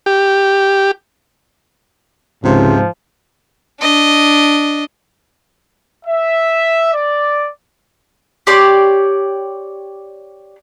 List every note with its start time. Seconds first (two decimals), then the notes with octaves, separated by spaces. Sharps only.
0.06 G4
2.44 C#2 G#2 C3 F3
3.81 D4 D#5
6.06 E5
6.93 D5
8.47 G4 C#5 D5 C6